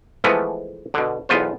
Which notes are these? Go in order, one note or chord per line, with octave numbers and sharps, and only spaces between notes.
E3 F3 G#3 A3 B3
B2 D3
B1 E2 B3 F4 C5